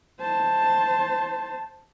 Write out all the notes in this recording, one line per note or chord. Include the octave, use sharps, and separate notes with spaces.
C5 A5